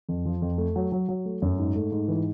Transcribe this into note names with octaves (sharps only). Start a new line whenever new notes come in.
F2
F3
F2
A3
F#3
F#3
F#3
A3
F#2
G#2
A3
G#2
E3